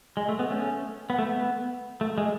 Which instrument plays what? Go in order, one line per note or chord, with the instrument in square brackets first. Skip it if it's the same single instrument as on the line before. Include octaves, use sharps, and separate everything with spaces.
[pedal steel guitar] G#3
A3
B3
A3 C#4
B3
A3
B3
A3
G#3